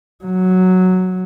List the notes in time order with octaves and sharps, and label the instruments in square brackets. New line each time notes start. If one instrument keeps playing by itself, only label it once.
[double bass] F#3